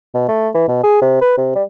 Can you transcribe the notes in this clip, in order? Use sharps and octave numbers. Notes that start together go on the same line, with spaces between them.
B2
A3
E3
B2
G#4
C3
B4
C3
G3